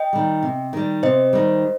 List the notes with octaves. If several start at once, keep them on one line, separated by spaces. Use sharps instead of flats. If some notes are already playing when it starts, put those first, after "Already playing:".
Already playing: D#5 G5
D#3 G3
C3
D#3 G3
C3 C5 D#5
D#3 G3